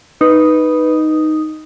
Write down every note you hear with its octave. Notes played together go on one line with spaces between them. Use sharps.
D#4 B4